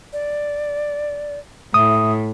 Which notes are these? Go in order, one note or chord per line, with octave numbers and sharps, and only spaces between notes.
D5
A2 E5 D#6